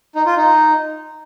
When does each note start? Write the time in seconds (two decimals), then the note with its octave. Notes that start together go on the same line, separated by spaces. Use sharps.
0.15 D#4
0.26 F4
0.36 D#4